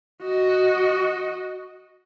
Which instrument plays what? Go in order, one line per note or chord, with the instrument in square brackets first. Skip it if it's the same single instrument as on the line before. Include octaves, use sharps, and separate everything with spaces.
[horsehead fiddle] F#4 D#5